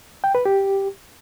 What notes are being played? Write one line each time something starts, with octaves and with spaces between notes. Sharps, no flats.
G5
B4
G4